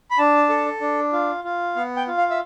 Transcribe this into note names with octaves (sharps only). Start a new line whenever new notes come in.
B5
D4 A5
A4
D4
F4
F4
B3 F5
G5
F4
F5
E5